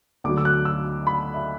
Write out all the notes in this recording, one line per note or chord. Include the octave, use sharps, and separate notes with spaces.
D2 D3 F#3 D6
E6
F#6
E6
B5
E5